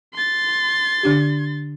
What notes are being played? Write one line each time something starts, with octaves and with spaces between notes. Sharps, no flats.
C6 A6
D3 D4 G4